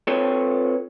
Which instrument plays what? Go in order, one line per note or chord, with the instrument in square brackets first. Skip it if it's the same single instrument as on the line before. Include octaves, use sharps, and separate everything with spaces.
[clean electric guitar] C4 F4 A4 B4 C#5